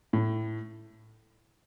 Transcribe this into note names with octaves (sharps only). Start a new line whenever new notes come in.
A2